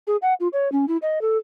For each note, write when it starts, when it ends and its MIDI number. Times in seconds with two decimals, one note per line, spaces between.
0.07 0.17 68
0.22 0.34 78
0.40 0.48 65
0.53 0.71 73
0.72 0.85 61
0.88 0.97 64
1.02 1.21 75
1.21 1.37 69